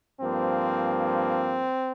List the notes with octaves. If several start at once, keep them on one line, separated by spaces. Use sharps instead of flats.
G2 F3 A#3 C4